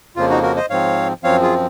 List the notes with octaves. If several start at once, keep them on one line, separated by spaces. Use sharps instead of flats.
F2 C#3 F3 A#3 F4
D#4 F#4
F#4 A#4
C5 D#5
G#2 F3 C4 C#5 F5
F#2 F3 C4 C#5 F5
F4 G#4